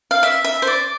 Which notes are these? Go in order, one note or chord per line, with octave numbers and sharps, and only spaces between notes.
F5
E5
E5
C5
D5